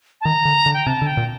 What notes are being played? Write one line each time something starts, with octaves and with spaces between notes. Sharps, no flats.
A5
D#3 A#5
D3
D3
G5
C3 A5
D3
G5
A#2